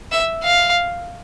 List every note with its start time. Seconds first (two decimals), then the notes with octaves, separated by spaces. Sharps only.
0.12 E5
0.44 F5